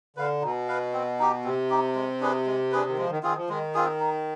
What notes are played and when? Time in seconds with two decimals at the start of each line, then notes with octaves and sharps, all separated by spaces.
0.16 D3 B4 F5
0.42 B2 D#4
0.68 B4 F5
0.93 C4
1.19 D#4 G4
1.44 C3 C4
1.70 D#4 G4
1.95 G#3
2.21 D4 G#4 B4
2.46 G#3
2.72 D4 G#4 B4
2.89 D#3
2.97 F3 G#3
3.10 D#3
3.23 D#3 C4 F4 G#4
3.36 F3
3.49 D#3 G#3
3.74 C4 F4 G#4
4.00 D#4